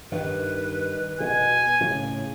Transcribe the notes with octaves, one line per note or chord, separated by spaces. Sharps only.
G2 D#3 B4
B2 G#5
A2 C#3